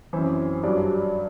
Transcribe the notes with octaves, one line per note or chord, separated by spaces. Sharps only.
F#2 E3 C4 C5
G2 F#3 D4 D5